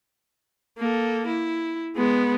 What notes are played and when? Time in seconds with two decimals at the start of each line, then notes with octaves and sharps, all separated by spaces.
0.78 A#3 A4
1.27 E4
1.96 G#3 B3